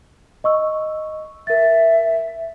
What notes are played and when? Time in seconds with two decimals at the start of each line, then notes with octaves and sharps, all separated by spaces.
0.44 D#5 C#6 E6
1.47 A#4 E5 A6